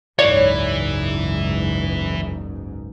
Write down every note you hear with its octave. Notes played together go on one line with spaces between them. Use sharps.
F#1 C#2 G#2 E3 C#5 D5